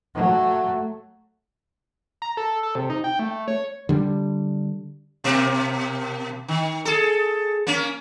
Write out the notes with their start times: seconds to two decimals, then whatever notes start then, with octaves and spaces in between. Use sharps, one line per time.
0.15 F#3 A3
2.22 A#5
2.37 A4
2.63 A4
2.75 C3
2.90 D#4
3.04 G5
3.19 A3
3.48 C#5
3.89 D3 G3
5.24 B2 A#3
6.48 D#3
6.85 G#4 A4
7.67 A#3 C#4